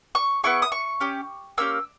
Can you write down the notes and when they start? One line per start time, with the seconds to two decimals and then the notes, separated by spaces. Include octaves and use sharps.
0.15 C#6
0.43 B3 E4 G#4 C#6
0.62 D#6
0.72 C#6
1.00 C#4 G4
1.58 A#3 C#4 G4 E6